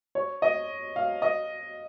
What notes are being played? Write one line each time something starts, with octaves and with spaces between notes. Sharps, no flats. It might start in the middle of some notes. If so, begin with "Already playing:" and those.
C#5
D#5
F5
D#5